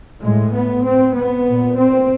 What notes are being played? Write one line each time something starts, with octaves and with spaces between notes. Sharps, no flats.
A2 G#3
B3
C4
B3
A#2
C4